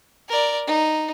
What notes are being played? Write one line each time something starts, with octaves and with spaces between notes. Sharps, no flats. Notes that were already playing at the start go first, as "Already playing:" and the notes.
A#4 D5
D#4